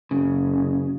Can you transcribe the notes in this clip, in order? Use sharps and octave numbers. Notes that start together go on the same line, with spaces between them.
F#1 C#3